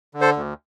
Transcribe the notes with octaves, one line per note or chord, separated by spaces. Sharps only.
D3
A4 C5
D2